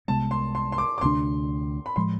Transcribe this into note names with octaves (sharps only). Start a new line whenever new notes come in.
C2 C3 G#3 B3 A5
C6
C6
C6
D6
D6
D2 C3 G#3 D4 C6
B5
A2 F3 G#3 C6